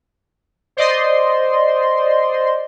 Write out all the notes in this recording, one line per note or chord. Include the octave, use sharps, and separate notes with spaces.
C5 D5 D#5 C6